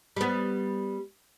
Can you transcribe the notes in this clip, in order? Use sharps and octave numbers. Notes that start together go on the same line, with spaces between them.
G3 B3